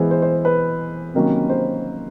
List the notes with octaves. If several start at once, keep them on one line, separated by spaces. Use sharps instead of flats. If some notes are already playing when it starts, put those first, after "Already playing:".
Already playing: E3 G#3 B3 C5
C5
C5
B4
C3 D#3 F#3 A#3 C#4
C5